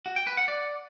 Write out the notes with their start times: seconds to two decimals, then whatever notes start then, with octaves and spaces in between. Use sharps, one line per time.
0.06 F#4
0.16 G5
0.27 B4
0.37 F#5
0.48 D5